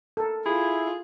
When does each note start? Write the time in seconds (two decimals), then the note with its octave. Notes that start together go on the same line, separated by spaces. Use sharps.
0.17 A4 A#4
0.46 E4 F4 G#4